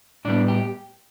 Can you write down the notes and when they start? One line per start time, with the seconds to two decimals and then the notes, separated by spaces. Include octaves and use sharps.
0.25 A2 G3 B3 D4
0.48 G4